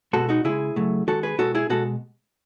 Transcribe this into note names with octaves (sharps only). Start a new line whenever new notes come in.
B2 G#3 F#4 A4
D#4 F#4
C#3 G#3 E4 G#4
C#3 F#3 A3
D#3 G#3 F#4 A4
G#4 B4
B2 G#3 F#4 A4
E4 G#4
B2 G#3 F#4 A4